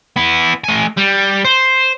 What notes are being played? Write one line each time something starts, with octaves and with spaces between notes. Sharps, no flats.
B3 E4
A3 G#5
G3
C5